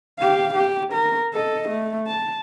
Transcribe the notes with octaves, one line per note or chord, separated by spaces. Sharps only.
G4 F5
G4
A#4
A4 D#5
A3
A5